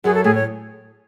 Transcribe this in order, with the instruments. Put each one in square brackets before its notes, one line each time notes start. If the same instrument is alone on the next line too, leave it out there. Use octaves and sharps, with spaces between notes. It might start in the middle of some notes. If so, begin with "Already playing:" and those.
[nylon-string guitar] F#2 F#3 [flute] G#4
[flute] A4
[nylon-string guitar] A2 A3 [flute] G#4
[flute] C#5